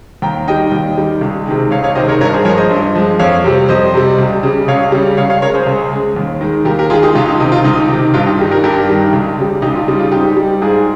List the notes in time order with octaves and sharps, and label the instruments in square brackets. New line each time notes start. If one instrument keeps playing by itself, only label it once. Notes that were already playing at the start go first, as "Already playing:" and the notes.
[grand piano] D#2 G5 A#5
D#3 G3 D#5 G5
D#2
D#3 G3
C#2
C3 D#3 G#3
C#2 C#5 F5
C#5 F5
C3 D#3 G#3 C5 D#5
A#4 C#5
G2 A#4 C#5
G#4 C5
F3 A#4 C#5
G#3
C5 D#5
G2
F3 G#3
F2 C#5 F5
C3 G3
F2 C5 D#5
C3 G3
C#2
C#3 G3
C#2 C#5 F5
C#3 G3
C#2 C#5 F5
C#5 F5
C#3 A#4 C#5
G#3
G#4 C5
C#2
C#3 G#3
D#2
D#3 G#3
D#2 G4 A#4
G4 A#4
G#3 F4 G#4
D#3
D#4 G4
C#2 F4
D#4
C3 D#3 D#4
F4
C#2 D#4
C3 D#3
G2 F4
D#4 G4
D#3 G3
G4 A#4
G2 G4 A#4
D#3 G3
C#2
C#3 G3
C#2 D#4 G4
F4
C#3 G3 D#4
F4
G#2 D#4 G4
G3
G#2 F4 G#4